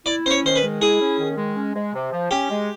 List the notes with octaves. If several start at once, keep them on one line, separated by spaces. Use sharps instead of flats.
E4 D5
C#4 C5
C#5
D#3 C5
B4
G#3
E4 G#4
C#4
D#3
G#3
C#4
G#3
C3
F3
C#4 G4
G#3